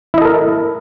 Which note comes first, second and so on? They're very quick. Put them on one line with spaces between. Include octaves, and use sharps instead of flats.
E4 D#5 A4 A#4